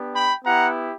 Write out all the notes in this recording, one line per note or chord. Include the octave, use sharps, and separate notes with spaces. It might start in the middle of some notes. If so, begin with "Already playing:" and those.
Already playing: B3 D4 G4
G5 B5
B3 E4 G4 F#5 A#5